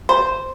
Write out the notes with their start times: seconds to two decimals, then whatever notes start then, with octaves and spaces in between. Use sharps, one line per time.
0.09 C5